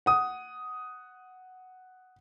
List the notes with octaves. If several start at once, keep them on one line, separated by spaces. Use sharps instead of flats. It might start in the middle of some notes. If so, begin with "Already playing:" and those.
F#5 D#6